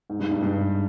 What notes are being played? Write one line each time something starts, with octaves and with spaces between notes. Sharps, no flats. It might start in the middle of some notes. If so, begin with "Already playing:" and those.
G#2
G2
G2
G2